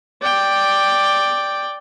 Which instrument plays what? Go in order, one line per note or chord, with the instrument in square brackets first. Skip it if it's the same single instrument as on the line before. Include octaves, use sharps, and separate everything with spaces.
[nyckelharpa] D5 G5